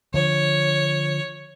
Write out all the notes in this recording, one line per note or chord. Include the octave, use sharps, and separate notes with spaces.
D3 F3 C#5